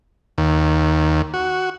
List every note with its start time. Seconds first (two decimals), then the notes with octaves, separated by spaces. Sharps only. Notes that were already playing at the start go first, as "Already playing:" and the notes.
0.38 D#2
1.34 F#4